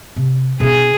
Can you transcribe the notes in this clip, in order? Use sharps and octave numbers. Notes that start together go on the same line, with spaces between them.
C3
B2 D#4 G#4